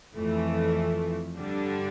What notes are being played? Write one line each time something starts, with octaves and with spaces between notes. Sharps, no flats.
F2 E3 A3
G2 D3 G3 D4